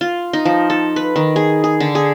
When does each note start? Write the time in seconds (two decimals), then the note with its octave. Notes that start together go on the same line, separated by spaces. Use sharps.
0.01 F4
0.33 D#4
0.45 F3
0.70 A4
0.96 B4
1.16 D#3
1.36 G#4
1.64 G#4
1.80 D3
1.95 G#4